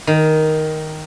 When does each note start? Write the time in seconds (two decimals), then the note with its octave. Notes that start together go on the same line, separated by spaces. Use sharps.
0.07 D#3